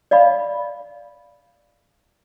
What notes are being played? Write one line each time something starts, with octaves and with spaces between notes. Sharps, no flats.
D5 D#5 F5 B5